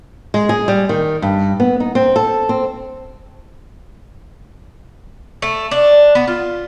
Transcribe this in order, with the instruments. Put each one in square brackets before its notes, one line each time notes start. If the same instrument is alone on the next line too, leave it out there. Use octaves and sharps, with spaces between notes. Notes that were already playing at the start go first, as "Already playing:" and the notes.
[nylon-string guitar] G#3
G#4
G3
D#3
G2
B3
D#4
C4
A4
C4
[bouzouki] A3
D4
B3
F4